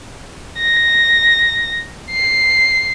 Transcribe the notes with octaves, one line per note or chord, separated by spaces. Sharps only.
A#6
C7